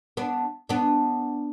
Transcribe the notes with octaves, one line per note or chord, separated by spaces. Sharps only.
B3 D4
B3 D4